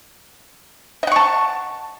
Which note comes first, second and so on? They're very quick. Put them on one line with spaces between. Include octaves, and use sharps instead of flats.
D#5 F#5 C#6 A5